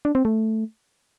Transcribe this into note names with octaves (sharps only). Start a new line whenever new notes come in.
D4
C4
A3